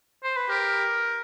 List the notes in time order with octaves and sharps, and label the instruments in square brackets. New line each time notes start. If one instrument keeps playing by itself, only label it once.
[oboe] C5
B4
[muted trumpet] G4 [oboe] A#4